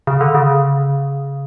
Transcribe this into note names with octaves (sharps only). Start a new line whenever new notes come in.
C#3
D3
C#3